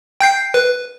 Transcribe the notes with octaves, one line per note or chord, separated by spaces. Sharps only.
G5 G6 C7
B4